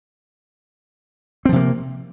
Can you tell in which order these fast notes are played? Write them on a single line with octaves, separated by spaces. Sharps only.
C4 F3 C3 A#3